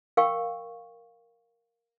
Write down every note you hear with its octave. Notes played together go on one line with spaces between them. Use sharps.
A#4 F5 G5 C#6